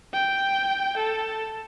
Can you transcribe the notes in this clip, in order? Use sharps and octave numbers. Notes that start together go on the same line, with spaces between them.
G5
A4